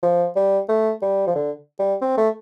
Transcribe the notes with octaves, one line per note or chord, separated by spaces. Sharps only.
F3
G3
A3
G3
F3
D3
G3
C4
A3